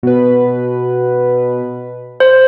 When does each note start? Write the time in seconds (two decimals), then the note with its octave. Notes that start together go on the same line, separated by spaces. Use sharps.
0.03 B2 B4
2.20 C5